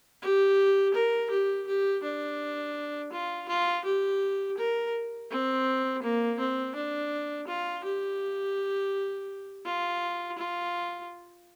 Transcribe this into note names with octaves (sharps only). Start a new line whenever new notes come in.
G4
A#4
G4
G4
D4
F4
F4
G4
A#4
C4
A#3
C4
D4
F4
G4
F4
F4